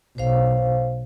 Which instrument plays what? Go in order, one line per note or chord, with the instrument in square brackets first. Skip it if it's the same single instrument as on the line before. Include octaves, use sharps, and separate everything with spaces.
[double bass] B1 [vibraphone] C5 F5